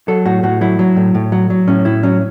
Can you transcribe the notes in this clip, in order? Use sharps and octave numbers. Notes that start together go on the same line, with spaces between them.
F#3 A4
A2 F#4
A2 F#4
F#3 E4
F#3
A2
A2
F#3
F#3
A2 C#4
A2 E4
F#3 C#4